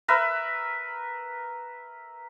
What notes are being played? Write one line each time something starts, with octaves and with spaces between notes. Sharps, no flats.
A#4 B4 E5